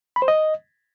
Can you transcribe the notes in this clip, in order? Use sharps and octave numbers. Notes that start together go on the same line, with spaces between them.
B5
C5
D#5